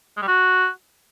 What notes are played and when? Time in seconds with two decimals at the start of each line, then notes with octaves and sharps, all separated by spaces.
0.17 G#3
0.22 G3
0.28 F#4